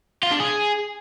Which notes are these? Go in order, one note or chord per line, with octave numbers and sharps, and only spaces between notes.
F4
D4
G#4